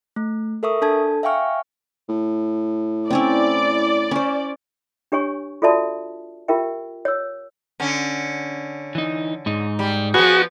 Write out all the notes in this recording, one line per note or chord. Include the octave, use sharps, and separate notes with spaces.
A3
A4 A#4 E5 C#6 D#6
D4 A4 A5 G#6
E5 F5 G5 G#5 C#6 F6
A2
C4 C#4 E4 D5
C#4 C5
D4 G4 C#5 G#5 C#6
F4 F#4 A4 D5 E5 A5
F4 G4 A#4 E5 G5
C#5 E6
D3 C#4
E3 D#4
G#2 D#4
G3
F3 B3 F#4 G#4